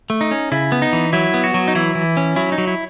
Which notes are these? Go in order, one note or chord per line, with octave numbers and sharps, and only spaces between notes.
A3
D#4
C#4
C#3 E4
B3
D#4
E3
F#3 E4
B3
F#4
F#3
D#4
E3 E4
E3
C#4
F#3 E4
D#4
F#3
E4